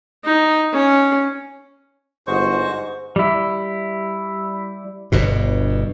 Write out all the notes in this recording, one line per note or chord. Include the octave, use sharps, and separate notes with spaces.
D#4
C#4
G1 G#2 F#4 C5 C#6
G3 E4
G1 G2 B2